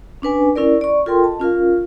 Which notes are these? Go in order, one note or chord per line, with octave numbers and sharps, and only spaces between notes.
C#4 D4 B4 G#5
C#4 E4 A#4 D5
D5 C#6
F4 A4 A#4 G5 C6
D#5 A5
C#4 F4 A#4 F5